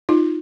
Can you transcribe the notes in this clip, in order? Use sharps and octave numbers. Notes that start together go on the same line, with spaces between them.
D#4 F4